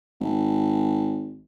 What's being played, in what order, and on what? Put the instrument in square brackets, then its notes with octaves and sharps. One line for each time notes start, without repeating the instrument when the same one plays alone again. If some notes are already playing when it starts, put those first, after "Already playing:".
[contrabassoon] G#1